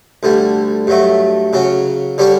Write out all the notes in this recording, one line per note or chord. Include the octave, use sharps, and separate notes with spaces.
D2 D3 G3
G2 F#3 A3
C#3 F#3 C#4
D3 G3 C#4 G4